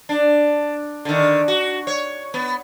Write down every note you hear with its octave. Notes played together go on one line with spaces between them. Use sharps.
D4
D3 D#3
F#4
C#5
B3